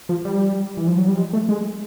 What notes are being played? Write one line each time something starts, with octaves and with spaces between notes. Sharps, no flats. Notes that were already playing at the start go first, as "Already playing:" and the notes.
F3
G3
E3
F3
F#3
G3
G#3
A3
G#3